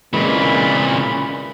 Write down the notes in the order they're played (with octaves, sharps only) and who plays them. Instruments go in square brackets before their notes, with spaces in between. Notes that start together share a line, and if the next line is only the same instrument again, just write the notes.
[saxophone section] A#2 [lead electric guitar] C#3 C4 [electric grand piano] E3 G#3 [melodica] B5